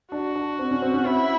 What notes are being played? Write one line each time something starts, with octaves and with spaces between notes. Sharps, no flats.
D4 F#4
D4
C4
C#4
C4
C#4
C4 E4